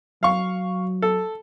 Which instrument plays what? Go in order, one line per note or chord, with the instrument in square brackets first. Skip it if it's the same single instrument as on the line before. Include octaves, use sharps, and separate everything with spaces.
[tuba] F#3 [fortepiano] F5 C#6
[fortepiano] A4